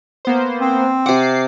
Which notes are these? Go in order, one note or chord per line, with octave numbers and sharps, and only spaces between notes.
A#3 B3 C5
C4
C3 F#5 D6 C7